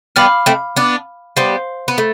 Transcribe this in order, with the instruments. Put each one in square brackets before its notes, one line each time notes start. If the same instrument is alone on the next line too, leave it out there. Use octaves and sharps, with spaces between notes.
[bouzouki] G3 B3 [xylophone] F5 B5 D6 F6
[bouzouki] A3 C4
B3 D4
[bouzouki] G3 B3 [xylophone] C5 F5 C6
[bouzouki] B3
A3